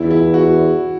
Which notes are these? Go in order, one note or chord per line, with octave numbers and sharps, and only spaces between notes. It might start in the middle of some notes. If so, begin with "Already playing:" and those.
Already playing: E2 E4
E4
F#4